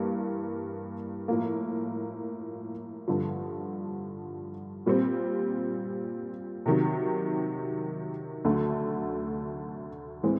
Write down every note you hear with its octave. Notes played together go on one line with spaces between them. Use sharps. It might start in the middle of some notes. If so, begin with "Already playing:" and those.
Already playing: G2 E3 G3 A#3
A2 F3 A#3
G2 D3 F3
A#2 G3 C4
C3 D#3 F#3
D2 D3 F#3 A3
A2 E3 G#3 C4